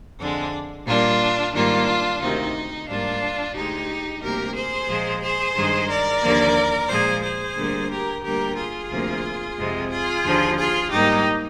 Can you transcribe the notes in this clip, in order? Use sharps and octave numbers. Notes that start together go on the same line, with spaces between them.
F2 D3 G#3 D4
A#2 G3 A#3 D4 F4
G#2 D#3 G3 A#3 D4 F4
D2 C3 D#3 D#4
G#2 G3 A#3 D4 F4
D2 D3 G#3 D#4 G4
D2 C3 G3 A#3 G4 A#4
G#4 C5
A#2 F3 G#3
G#4 C5
G2 D#3 G#3
A#4 D5
D#2 D3 F3 A#3
A#2 F3 G#3 G#4 C5
G#4 C5
D2 D3 G3 A#3
G4 A#4
D2 D3 G3 A#3 G4 A#4
F4 G#4
D2 C3 F3 A#3
F2 C3 F3 G#3
F4 G#4
D#2 D3 F3
F4 G#4
G#2 G3 A#3 D#4 G4